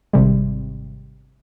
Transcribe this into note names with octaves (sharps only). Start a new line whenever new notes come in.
G#1 C3 G3